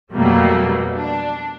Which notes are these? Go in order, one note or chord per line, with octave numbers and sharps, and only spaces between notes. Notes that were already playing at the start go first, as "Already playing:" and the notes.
F2 B2 F#3 G3 A3 A#3
D4